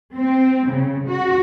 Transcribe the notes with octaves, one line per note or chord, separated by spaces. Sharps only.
C4
C#3
F#4